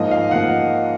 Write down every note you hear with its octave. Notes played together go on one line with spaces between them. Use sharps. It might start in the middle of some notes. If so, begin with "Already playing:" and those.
Already playing: G#2 F3 A#3 D#5
F5
F3 A#3 F#5